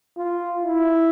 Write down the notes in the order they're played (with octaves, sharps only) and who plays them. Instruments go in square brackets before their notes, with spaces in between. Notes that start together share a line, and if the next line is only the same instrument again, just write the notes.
[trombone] F4
E4